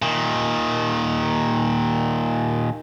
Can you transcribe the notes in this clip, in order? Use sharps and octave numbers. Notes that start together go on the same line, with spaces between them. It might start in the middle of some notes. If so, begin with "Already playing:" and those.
A#2 D#3